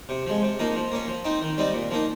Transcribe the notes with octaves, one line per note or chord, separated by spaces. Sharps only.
C3
F3 G#3
C3
F3 A#3 D#4
F3
A#3 C#4
F3
C4 D#4
D#3
G3 C4 D#4
A#2
F3 A#3 D#4